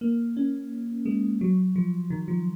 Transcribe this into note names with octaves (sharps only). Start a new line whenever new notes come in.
A#3
C#4
G#3
F#3
F3
D#3
F3